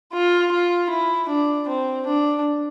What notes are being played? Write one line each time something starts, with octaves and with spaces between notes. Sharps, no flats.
F4
F4
E4
D4
C4
D4